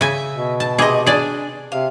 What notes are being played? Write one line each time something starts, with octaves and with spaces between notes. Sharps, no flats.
C#3 E5 G#5
B2
A5
C3 G#4 D#5 B5 D6
D4 G#4 D5 G#5
C3 F5